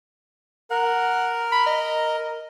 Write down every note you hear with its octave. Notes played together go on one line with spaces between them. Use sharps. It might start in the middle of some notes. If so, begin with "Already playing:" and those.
A#4 F#5
B5
D#5